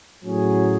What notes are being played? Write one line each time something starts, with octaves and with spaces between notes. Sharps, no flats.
A2 F#3 C#4 G#4